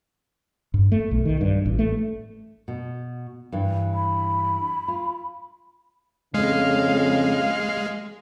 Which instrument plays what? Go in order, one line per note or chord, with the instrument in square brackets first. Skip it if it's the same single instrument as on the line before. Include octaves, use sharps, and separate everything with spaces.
[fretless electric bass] G2
A3
B1
D#3
G2
A1
A3
[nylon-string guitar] B2
G2 E3
[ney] B5
[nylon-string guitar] F4
[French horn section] F2 C#3 [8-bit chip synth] G#3 [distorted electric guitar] F5